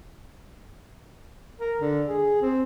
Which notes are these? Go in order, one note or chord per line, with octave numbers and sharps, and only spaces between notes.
A#4
D3
G#4
C4